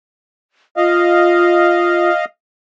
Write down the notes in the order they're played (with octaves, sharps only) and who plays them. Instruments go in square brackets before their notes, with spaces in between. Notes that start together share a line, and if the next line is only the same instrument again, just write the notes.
[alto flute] F4 [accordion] D#5 F5